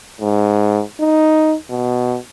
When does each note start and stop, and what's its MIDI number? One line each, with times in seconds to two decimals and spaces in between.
0.21 0.82 44
1.00 1.56 63
1.70 2.17 47